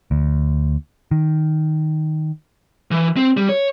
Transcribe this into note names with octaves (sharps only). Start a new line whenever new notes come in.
D2
D#3
E3
C4
G3
C#5